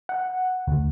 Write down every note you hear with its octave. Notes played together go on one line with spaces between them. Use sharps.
F#5
D2